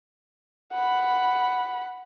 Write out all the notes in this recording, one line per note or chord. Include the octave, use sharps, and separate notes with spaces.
F#5 B5